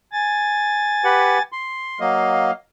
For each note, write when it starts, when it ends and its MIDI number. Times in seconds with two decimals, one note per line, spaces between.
0.13 1.42 80
0.13 1.42 93
1.04 1.38 67
1.04 1.38 71
1.04 1.38 78
1.52 2.00 84
2.00 2.51 54
2.00 2.51 58
2.00 2.51 75
2.00 2.53 77